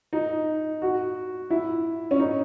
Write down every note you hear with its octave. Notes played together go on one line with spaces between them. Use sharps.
D#4
F#4
E4
C#4
D#4